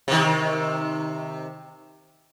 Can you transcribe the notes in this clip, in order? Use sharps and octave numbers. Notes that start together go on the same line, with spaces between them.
C3 D#3